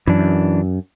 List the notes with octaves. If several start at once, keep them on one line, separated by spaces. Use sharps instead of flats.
F#2 E3 D4